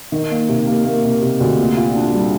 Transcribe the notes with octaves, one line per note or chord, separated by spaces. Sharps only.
D#3
A#3
C3
A#3
A#3
C3
C3
D2
A#2
F4
D4
G3